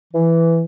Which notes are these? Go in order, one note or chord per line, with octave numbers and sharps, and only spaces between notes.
E3